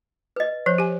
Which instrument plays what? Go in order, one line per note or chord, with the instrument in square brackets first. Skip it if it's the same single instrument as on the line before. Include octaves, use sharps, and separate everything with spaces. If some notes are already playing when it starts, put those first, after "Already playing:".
[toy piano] B4 D#5
[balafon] F3 [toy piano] C5 C#5
[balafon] G4 G#5